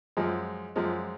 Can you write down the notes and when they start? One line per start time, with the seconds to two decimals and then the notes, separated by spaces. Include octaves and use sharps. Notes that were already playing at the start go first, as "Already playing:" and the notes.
0.17 F#2 F3 G#3
0.76 F#2 F3 G#3